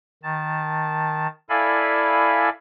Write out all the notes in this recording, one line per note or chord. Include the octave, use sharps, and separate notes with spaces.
D#3 A5
E4 A4 D5 F5 G#5 B5